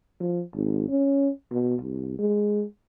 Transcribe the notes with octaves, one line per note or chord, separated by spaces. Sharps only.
F3
G#1
C#4
B2
C2
G#3